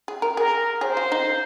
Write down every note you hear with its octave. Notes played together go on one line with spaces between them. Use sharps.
G#4
A#4
G#4 A#4
G#4 C5
F4
D#4